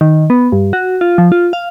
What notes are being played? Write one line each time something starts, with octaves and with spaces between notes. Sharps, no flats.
D#3
B3
G2
F#4
F4
F3
F4
F5